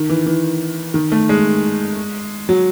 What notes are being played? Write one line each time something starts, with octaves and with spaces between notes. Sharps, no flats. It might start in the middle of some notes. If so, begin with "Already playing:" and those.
Already playing: D#3
E3
E3
D#3
A3
G#3
F#3